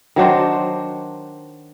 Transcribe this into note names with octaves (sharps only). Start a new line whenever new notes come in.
D#3 F#3 D4 C5